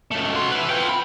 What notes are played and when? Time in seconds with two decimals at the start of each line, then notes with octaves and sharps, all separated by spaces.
0.11 C#2 A3
0.35 F#4 C6
0.52 E4 B4
0.70 F4 G5
0.89 B5